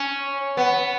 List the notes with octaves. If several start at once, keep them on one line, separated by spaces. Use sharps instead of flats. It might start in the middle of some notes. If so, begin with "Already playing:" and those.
Already playing: C#4
B3